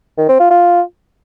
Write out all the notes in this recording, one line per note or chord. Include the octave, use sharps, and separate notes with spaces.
D#3
C4
F4
F4